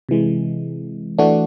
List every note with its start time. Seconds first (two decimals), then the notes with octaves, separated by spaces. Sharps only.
0.09 C3 E3 G#3
1.18 E3 A3 D4 F#4